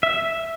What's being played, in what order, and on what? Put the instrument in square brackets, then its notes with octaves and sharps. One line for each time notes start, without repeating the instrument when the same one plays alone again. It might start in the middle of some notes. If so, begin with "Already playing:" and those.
[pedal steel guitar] E5